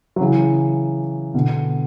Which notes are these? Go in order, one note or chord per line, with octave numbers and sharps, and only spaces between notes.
F#3
C#3 E3
B2 D3